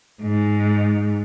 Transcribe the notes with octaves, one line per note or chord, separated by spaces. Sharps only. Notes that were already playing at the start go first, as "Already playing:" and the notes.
G#2